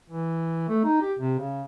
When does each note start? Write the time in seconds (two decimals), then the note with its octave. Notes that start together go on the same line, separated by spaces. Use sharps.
0.09 E3
0.68 A3
0.84 D#4
1.01 G4
1.18 C3
1.39 C#3